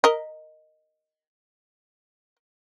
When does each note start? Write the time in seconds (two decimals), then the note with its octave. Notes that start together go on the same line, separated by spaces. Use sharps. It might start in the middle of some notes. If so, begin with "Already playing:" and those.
0.04 A#4 D#5